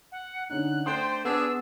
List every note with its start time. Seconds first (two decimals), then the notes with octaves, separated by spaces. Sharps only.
0.12 F#5
0.49 D3 C#4 D#4 F#6
0.86 A3 D4 C5 G5 C6
1.25 B3 D4 G#4 E6